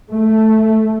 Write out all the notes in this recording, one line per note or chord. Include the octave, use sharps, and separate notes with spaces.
A3